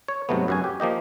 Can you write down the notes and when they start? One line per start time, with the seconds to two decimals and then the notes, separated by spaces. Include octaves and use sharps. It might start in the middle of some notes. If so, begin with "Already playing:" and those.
0.08 C#5
0.29 G#2 C3 F#3 A3 B3
0.48 F#2 F#4 G#5
0.64 G4
0.80 F3 A#3 G4 D#5